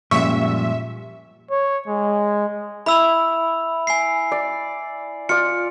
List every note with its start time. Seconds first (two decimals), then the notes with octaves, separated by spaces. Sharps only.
0.11 F#2 A#2 F3 G3 G#3 E5 C#6
1.51 C#5
1.87 G#3
2.86 E4 E5 B5 E6 F7
3.87 G#5 C7
4.32 D5
5.29 F4 D5 C#7